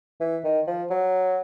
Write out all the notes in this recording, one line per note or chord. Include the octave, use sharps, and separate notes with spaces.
E3
D#3
F3
F#3